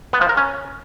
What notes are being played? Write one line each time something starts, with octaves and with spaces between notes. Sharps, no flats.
B3
F3
A#4
C#4